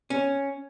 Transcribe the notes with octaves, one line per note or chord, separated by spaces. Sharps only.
C#4